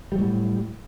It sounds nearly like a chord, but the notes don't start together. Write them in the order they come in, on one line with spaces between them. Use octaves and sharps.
G3 F#3 A2